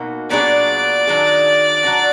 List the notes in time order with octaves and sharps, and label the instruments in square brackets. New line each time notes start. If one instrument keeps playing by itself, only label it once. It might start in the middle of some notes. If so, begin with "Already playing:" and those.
Already playing: [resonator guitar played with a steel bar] B2 A#3 D#4 F#4
[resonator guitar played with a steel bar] A#2 F#3 B3 D4 G#4 [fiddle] D5
[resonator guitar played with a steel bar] D#3 F#3 D4 G#4
F#3 D4 F#4